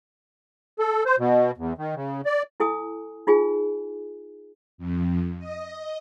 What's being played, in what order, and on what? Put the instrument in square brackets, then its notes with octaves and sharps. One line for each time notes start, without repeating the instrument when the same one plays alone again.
[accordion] A4
C5
B2
E2
D#3
C#3
D5
[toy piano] E4 A4 G#5 D#6
D#4 F4 G#4 G#5
[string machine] F2
D#5